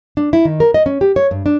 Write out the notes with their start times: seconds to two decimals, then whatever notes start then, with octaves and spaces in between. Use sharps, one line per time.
0.17 D4
0.33 E4
0.45 D#3
0.60 A#4
0.74 D#5
0.86 C#4
1.01 G4
1.16 C#5
1.31 G2
1.46 D4